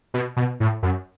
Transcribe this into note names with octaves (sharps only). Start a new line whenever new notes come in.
B2
B2
A2
F#2